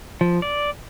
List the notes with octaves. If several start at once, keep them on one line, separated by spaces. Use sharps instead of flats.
F3
D5